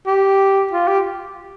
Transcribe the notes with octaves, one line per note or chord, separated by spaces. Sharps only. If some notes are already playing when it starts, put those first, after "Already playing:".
G4
F4
G4